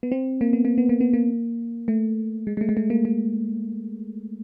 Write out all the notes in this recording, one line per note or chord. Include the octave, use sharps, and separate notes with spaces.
B3
C4
A#3
B3
A#3
B3
A#3
B3
A#3
A3
G#3
G#3
A3
G#3
A3
A#3
A#3